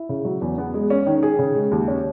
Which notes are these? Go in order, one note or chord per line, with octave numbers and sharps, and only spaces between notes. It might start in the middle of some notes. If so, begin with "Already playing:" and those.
Already playing: E4
C#3
F#3
E2
B3
G#3
C#4
D#3
G#4
C#3
G#3
D#2
C#4